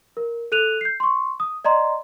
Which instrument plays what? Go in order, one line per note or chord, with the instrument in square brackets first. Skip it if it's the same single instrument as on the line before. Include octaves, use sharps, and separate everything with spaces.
[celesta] A#4
A4 F#6 D#7 F7
G6 C7
C6 C#6
D#6
D5 D#5 A#5 C6